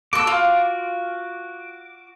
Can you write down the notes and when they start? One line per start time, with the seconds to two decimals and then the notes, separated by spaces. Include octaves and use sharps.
0.13 F#4 A4 D6 E6
0.27 F4